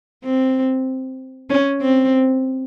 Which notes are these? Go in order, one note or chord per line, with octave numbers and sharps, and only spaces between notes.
C4
C#4
C4